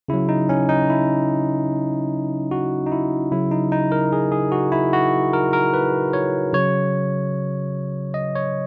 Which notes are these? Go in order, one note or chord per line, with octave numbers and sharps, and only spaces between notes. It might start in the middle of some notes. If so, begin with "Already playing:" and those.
C#3 F#3 E4
D#4
C#4
D#4
E4
F#4
D#4
E4
C#3 F#3 E4
D#4
D#4
A#4
G#4
G#4
F#4
E4
F#4
A#4
A#4
B4
C#5
C#3 F#3 C#5
D#5
C#5